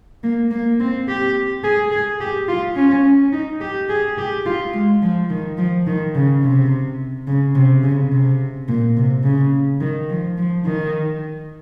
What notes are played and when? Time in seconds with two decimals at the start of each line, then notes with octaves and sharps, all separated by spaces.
0.23 A#3
0.51 A#3
0.80 C4
1.08 G4
1.64 G#4
1.92 G#4
2.21 G4
2.48 F4
2.76 C#4
3.33 D#4
3.61 G4
3.89 G#4
4.18 G4
4.46 F4
4.74 G#3
5.02 F3
5.30 D#3
5.58 F3
5.87 D#3
6.15 C#3
6.43 C3
7.27 C#3
7.55 C3
7.83 C#3
8.12 C3
8.68 A#2
8.97 C3
9.24 C#3
9.80 D#3
10.09 F3
10.38 F3
10.65 D#3